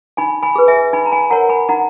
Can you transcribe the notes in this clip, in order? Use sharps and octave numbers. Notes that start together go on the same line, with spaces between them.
D#4 G#5 B5
G#5 B5
G#4 B4
E5 G#5
D#4 G#5 B5
A#5
G#5 B5
A#4 C#5 F#5 A#5
G#5 B5
D#4 F#5 A#5